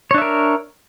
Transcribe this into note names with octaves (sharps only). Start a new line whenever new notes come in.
D4 A#4 C#5 E5